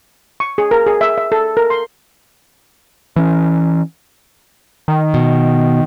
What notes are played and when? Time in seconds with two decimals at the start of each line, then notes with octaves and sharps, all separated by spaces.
0.40 C#6
0.58 G#4
0.71 A#4
0.86 G#4
1.01 E5
1.18 E5
1.32 A4
1.57 A#4
1.70 C6
3.16 E3 C#4
4.88 D#3
5.14 B2